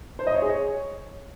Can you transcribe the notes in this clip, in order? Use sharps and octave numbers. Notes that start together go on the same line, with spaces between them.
C5
D#5
C#5
G#4
C#5